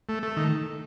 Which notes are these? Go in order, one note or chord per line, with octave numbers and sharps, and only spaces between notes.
A3
A3
D#3